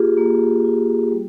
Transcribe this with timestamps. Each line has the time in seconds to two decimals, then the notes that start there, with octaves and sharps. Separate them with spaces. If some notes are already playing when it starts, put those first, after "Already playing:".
Already playing: A#3 F4 G4 G#4
0.17 A#3
0.64 F4
1.12 G3